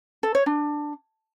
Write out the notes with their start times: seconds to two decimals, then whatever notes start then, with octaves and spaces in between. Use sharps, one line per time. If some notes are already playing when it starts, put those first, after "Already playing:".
0.23 A4
0.35 C#5
0.46 D4